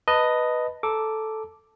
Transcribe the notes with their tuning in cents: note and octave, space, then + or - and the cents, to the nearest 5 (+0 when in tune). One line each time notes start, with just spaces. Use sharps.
B4 +0 D#5 +0 A5 +25
A4 -5 A#5 +0 D6 +0